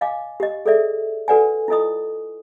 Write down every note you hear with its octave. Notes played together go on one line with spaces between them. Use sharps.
D#5 F5 G#5 D6
G4 D#5
G#4 A4 D5 E5
F#4 A4 B4 D5 F#5 G#5
E4 F4 A4 D#5 D#6